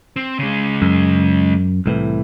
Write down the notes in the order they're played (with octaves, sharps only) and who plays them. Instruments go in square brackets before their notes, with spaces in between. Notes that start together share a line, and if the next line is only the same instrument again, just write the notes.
[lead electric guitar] C4
C#3 G#3
[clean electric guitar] F#2
C2 A2 E3